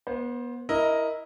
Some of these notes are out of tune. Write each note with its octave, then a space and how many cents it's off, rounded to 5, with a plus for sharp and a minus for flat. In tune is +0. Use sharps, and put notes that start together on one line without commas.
B3 -30 C5 +15
E4 -10 A#4 +0 D#5 +5